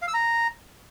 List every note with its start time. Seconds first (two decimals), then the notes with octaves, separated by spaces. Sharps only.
0.02 F5
0.08 E6
0.14 A#5